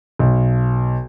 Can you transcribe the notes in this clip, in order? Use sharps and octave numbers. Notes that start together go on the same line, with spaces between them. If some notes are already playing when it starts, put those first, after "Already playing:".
B1